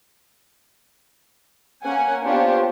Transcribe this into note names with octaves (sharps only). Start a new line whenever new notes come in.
A#3 C#4 F#5 G#5
B3 D4 F4 G4 C5 C#5